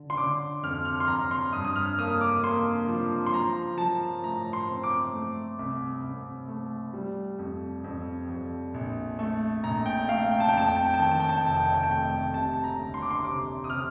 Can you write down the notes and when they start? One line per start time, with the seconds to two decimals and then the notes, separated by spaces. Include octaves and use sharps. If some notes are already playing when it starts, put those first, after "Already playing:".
Already playing: D3
0.10 C6
0.17 D3 D6
0.63 F2 F6
0.85 F6
1.00 C6
1.08 F2 A#5
1.31 C6
1.53 G2 D#6
1.65 D#6
1.76 F6
1.99 A#3 D#6
2.21 D6
2.44 A#3 C6
2.88 F3
3.27 C6
3.34 F3 A#5
3.78 F3 A5
4.24 A2 A#5
4.53 C6
4.69 C4
4.84 D6
5.13 A3
5.59 C2
6.04 C2
6.48 A3
6.93 G3
7.39 F2
7.84 F2
8.29 F2
8.74 A#1
9.19 A3
9.63 A#1 A#5
9.86 G5
10.09 A3 F5
10.31 G5
10.40 A5
10.49 G5
10.53 F2 A5
10.68 G5
10.76 A5
10.85 G5
10.94 A5
10.99 D#3 G5
11.11 A5
11.20 G5
11.29 A5
11.38 G5
11.44 F1 A5
11.57 G5
11.66 A5
11.75 G5
11.83 A5
11.89 A3 G5
12.34 C3 A5
12.53 A5
12.64 A#5
12.79 D2
12.94 C6
13.02 D6
13.11 C6
13.24 C3 D6
13.64 D#6
13.70 C3 F6